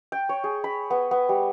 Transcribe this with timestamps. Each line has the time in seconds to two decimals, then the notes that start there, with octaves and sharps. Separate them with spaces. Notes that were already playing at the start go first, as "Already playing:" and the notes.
0.12 G5
0.29 C#5
0.44 G#4
0.64 B5
0.90 B3
1.11 B3
1.29 G3